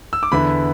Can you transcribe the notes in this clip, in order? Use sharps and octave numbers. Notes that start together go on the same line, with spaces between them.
E6
D6
E2 D3 B3 E4 B5